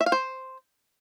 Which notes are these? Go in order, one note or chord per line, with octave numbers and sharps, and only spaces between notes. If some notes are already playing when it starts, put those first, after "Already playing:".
E5
F5
C5